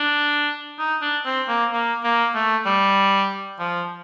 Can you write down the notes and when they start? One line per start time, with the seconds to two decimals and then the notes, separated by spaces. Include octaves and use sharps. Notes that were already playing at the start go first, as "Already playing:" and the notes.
Already playing: D4
0.79 D#4
1.02 D4
1.25 C4
1.49 A#3
1.72 A#3
2.04 A#3
2.35 A3
2.66 G3
3.59 F3